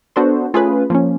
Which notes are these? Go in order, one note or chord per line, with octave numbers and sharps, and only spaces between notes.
B3 D4 F#4 A4 C5
A3 C#4 F4 G#4 B4
F3 A#3 C#4